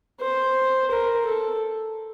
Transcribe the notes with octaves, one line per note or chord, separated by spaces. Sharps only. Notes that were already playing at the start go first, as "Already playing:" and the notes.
C5
A#4
A4